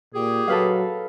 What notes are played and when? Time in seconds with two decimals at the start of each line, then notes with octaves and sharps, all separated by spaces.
0.14 A#2 G4 G#4
0.48 F#3 A4 B4 F5